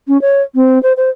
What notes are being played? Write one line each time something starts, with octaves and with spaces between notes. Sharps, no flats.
C#4
C#5
C4
C5
C5